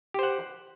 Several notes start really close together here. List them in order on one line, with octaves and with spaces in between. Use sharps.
G4 C5 F#5